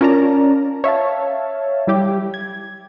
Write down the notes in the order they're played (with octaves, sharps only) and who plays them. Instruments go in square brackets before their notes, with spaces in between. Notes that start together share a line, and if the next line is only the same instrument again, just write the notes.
[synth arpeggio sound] C#4 F4 A#4 D5 A5 A#5
C#5 E5 F5 A5
G3 E4 G4
G#6